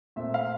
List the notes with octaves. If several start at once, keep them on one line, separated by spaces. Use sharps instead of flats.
A#2 A3 C4 E5
F5